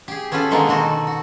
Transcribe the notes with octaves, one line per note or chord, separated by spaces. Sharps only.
G4 G#4
B3 C#4 F4 A4 B4
D3 D#3 G#3 A#3 B3
B2 D#3 F#4 A4
F#4